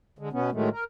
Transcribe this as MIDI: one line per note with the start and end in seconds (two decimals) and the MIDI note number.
0.19 0.29 50
0.19 0.29 56
0.32 0.50 47
0.32 0.50 59
0.32 0.50 61
0.52 0.69 45
0.52 0.69 51
0.52 0.69 54
0.52 0.69 56
0.52 0.69 57
0.71 0.84 70